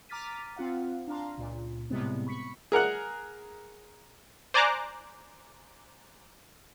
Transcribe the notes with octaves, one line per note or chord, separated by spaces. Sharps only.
A#5 D6 F6 A6 B6 D#7
C4 F4 F5 F#5
D4 F5 A#5 C6
C#2 A#2
A2 C3 G3 G#3 B3 C4
B5 C#6 B6 C#7
G#4 A#4 F#5 F#6
C5 D5 G#5 A#5 D6 F#6